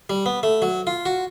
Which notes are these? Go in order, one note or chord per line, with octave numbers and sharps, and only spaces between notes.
G3
B3
A3
F#3
F4
F#4